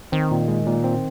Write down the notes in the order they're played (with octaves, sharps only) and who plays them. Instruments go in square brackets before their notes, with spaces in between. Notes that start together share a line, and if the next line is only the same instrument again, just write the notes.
[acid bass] D#3 [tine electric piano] C4
[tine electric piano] A#2
G#3
A#2
C4